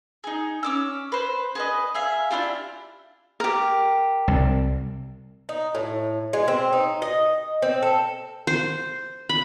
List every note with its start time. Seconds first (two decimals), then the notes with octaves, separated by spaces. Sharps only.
0.24 D#4 G#4
0.63 C#4 D6 E6
1.12 B4 C5
1.55 G#4 B4 D#5
1.95 G#4 E5 F5
2.31 D4 E4 F4 G4
3.40 G4 A#4
4.28 C2
5.49 D#4
5.75 A2
6.33 G#3
6.48 C4
6.73 D#4
7.02 D#5
7.62 C4
7.82 A4
8.47 C5
9.29 B5